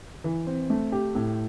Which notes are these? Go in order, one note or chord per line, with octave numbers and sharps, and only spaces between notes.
E3
C4
A3
G4
A2